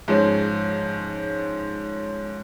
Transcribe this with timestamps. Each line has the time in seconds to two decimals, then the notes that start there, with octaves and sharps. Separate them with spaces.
0.08 G#2 F3 G#3 C#4